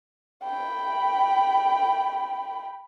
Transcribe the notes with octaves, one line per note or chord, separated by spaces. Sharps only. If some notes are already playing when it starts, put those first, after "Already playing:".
G5 B5